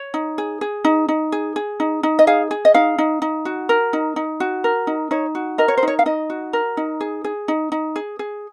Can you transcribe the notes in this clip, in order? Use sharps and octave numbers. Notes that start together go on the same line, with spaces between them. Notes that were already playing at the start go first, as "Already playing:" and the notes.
Already playing: C#5
D#4
G#4
G#4
D#4
D#4
G#4
G#4
D#4
D#4
D#5
G#4 F5
G#4
D#5
D#4 F5
D#4
D#4
F#4
A#4
D#4
D#4
F#4
A#4
D#4
D#4 C#5
F#4
A#4 D#5
C#5
C5
D#4 C#5
F5
D#4 D#5
F#4
A#4
D#4
G#4
G#4
D#4
D#4
G#4
G#4